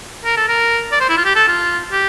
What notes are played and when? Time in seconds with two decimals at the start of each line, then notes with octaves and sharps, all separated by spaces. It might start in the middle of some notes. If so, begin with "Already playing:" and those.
0.25 A#4
0.37 A4
0.48 A#4
0.92 D5
1.00 C5
1.09 E4
1.17 F4
1.25 G4
1.36 A4
1.47 F4
1.92 G4